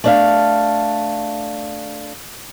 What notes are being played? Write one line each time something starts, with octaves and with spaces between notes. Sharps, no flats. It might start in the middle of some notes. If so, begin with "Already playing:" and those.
A3 D4 F5